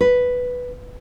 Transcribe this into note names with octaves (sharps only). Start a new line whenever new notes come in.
B4